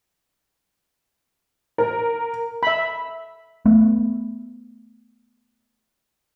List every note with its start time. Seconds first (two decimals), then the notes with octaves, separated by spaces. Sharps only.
1.78 A#4
2.63 E5 B5
3.66 A3 B3